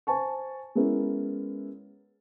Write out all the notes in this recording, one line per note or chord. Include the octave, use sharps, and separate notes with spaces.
C5 G#5 A5 C#6
G#3 B3 C#4 E4 A#4